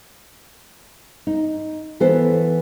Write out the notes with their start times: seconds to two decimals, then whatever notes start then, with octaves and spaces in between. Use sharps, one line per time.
1.27 D#4
2.00 E3 B3 A4 C5